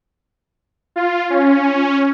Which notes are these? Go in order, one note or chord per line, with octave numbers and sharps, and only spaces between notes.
F4
C#4